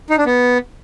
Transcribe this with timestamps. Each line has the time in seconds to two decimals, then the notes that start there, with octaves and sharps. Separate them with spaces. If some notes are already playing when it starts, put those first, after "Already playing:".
0.10 D#4
0.18 D4
0.26 B3